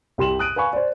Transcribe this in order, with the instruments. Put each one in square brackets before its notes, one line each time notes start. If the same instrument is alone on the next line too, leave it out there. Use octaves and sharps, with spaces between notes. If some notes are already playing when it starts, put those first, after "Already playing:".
[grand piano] C2 G4 C6 E7 F#7
D#6 F#6 D7 D#7
B4 F5 G#5 B5 C#6
C5 D5